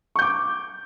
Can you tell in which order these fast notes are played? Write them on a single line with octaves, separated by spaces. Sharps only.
C#6 G6 D6